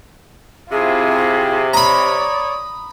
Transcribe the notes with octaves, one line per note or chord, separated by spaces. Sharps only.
C3 E4 F4 G#4
C#5 D5 A#5 B5 D#6